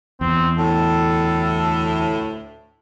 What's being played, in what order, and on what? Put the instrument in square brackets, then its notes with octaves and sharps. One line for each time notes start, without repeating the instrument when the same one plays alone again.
[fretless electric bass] E2 [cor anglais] C4
[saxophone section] D2 A2 [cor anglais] A4